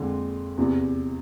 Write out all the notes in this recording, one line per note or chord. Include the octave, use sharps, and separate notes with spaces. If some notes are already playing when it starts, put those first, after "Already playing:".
Already playing: F2 D3 G#3
E2 C3 E3